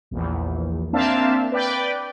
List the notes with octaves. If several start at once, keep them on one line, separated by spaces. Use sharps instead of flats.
A#1 E2
A#3 C4 D4 E5 F5 A5
B4 D5 G5